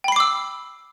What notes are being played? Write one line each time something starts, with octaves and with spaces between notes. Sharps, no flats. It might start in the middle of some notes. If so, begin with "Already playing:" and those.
G5 B5 D6 E6 C7